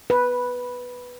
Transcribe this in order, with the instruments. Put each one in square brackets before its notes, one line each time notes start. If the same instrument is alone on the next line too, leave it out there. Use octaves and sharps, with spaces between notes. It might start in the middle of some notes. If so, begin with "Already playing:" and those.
[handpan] B4